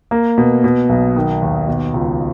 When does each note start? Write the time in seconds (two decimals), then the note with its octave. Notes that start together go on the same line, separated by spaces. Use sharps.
0.11 A#3
0.38 B2
0.64 B2
0.89 B1
1.16 D#3
1.42 D#2
1.68 B2
1.94 C#2